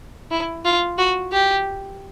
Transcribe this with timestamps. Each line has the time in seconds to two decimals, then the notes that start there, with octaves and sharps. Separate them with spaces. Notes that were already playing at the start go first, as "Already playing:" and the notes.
0.31 E4
0.65 F4
0.98 F#4
1.32 G4